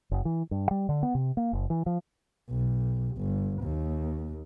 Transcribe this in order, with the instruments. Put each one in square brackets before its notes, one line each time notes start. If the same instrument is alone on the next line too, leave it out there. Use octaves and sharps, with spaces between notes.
[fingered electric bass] F#1
E3
G2
G3
D3
B3
C3
A#3
F#1
E3
F3
[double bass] B1
G1
D#2